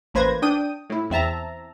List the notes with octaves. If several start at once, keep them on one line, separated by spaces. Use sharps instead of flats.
A1 A#3 B4 C5 G#6 A#6
D4 G5 D#6 D#7
A2 E4
E2 C4 E5 A5 A#5